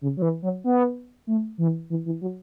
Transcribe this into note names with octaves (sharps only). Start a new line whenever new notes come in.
C#3
F#3
E3
F#3
B3
A3
E3
E3
E3
F#3